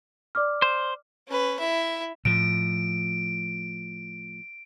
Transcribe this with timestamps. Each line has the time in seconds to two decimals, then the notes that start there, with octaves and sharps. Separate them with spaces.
0.35 D5 D6 F6
0.62 C5
1.28 C#4 B4
1.59 E4 E5
2.25 A2 F3 D7